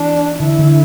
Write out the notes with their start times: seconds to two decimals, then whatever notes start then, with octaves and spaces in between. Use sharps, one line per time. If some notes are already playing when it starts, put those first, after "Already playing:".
Already playing: E3 D4
0.39 D3 E4
0.59 D3